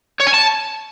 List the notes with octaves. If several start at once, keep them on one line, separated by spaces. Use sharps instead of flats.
C#5
G#5
A5